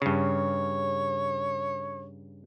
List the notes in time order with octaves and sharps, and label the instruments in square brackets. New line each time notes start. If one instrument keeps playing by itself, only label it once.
[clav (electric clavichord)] G2 C#3 [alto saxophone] C#5